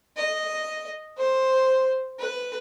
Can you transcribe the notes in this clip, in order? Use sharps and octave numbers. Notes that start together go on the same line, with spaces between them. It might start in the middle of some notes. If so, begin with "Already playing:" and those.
D#5
C5
B4